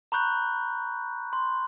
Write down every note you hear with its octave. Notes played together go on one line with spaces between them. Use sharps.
A#5 B5 C#6 F#6 G6
C6